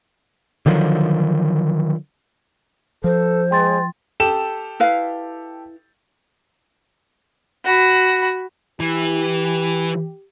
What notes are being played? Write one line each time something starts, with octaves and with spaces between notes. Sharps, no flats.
D3 D#3 F3 F#3
F3 A4 C5
G#3 G5 C6 A6
G4 A4 E7
E4 B4 F5
F#4 B5
E3 G4